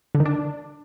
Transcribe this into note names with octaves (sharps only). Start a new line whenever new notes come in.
D3
D#3
D4